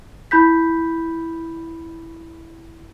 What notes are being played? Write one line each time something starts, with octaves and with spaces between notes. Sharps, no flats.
E4 B5 G6 B6